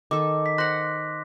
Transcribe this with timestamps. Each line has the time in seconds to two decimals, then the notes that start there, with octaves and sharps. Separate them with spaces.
0.11 D#3 A4 D6
0.46 B6
0.58 C5 F#5 C6 F#6 A#6